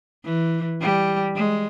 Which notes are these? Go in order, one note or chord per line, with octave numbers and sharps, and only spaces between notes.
E3
G3
G#3